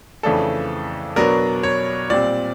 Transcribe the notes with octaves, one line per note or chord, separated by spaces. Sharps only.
F2 C#3 E3 A3 D4 A4
B2 F#3 B3 D4 A#4
C#5
A#2 G3 C4 D5